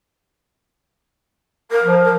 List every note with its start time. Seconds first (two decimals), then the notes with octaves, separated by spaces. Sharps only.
1.71 A#4
1.83 F3
2.04 A#4